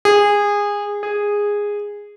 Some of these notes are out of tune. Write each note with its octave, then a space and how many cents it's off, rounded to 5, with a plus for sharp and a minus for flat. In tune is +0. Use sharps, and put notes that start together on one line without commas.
G#4 -20
G#4 -10